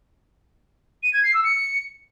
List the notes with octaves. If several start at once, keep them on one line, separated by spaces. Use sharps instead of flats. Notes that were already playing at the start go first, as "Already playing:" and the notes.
D#7
G#6
C7
E6
C#7